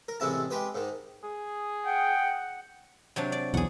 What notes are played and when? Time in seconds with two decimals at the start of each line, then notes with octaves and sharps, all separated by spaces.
0.08 A#4
0.20 A1 C3 G#3 C4 E4 A5
0.50 G#3 G4 B4 C5
0.75 G#2 D#3
1.24 G#4
1.86 F#5 G5
3.16 C3 F#3 D4
3.32 D5
3.54 B1 E2 G#4 F#5